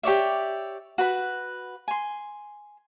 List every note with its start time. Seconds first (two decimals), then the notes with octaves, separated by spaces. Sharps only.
0.03 G4 C#5 D5 E5
0.98 F#4 B4 B5
1.88 G#5 C6